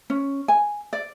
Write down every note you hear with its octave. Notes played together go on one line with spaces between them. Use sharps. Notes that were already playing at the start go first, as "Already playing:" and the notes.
C#4
G#5
D5